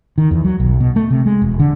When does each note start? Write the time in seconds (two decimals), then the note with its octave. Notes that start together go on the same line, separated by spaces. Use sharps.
0.18 D#3
0.31 E2
0.45 F#3
0.60 B1
0.80 B2
0.96 A3
1.10 C3
1.26 G#3
1.42 E1
1.60 D3